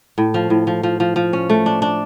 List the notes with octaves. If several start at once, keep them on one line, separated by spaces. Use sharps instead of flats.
A2
F3
A2
F3
F3
F3
F3
C#4
A3
D4
D4